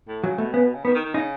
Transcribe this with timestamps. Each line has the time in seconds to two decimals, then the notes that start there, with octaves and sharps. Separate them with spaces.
0.08 A2
0.24 C#3 F#3
0.38 B2 A3
0.54 C#3 B3
0.64 B2
0.74 C#3
0.85 D#3 B3
0.95 D#3
1.05 D#3
1.14 C#3 D#4